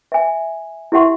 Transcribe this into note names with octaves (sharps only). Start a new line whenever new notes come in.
E5 G#5
E4 G4 E5 F#5 C6 C#6